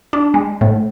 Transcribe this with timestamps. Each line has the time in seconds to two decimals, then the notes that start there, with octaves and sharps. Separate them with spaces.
0.13 D4
0.34 G#3
0.61 A2